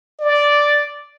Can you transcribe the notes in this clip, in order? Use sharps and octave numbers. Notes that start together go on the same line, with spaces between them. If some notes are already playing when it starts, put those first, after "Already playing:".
D5